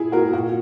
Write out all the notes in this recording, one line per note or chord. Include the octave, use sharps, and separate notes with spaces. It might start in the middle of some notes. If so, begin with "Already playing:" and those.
Already playing: A#2 E4 G#4
F#4 A#4
A#2 F#4